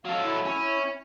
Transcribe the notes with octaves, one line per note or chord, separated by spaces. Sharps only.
F#3 A4 F5
E4
C#4